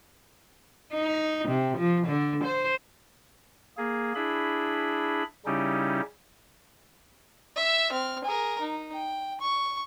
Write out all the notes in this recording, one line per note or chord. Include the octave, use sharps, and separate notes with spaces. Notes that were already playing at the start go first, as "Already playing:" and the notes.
D#4
C3
F3
D3
C5
A#3 G#4
D4 E4 G#4 B5
C#3 G3 C#4 D#4 E4 G4
E5 E6
C4 F6
G#4 A#4
D#4
G5
C#6